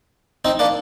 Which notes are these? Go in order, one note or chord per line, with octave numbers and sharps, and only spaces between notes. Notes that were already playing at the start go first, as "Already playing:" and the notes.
C4 D#4
A#3 D4